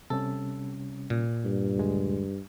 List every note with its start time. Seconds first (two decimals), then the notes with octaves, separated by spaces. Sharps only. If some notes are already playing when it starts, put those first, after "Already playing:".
0.10 C3 G3 C#4 A4
1.10 A#2
1.45 G2
1.76 D#2 D3 G#3